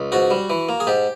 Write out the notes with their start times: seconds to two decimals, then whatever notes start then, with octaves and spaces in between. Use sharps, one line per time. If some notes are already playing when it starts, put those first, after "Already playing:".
Already playing: C#2
0.12 G#2 F#4
0.31 G3
0.50 E3
0.69 A#3
0.80 G#4
0.87 G#2 G4